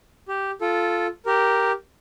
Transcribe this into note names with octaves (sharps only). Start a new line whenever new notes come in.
G4
F4 A4
G4 A#4